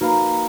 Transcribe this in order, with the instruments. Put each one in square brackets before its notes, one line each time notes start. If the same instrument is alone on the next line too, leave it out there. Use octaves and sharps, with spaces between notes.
[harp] A#3 [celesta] D#4 F#4 B4 F5 B5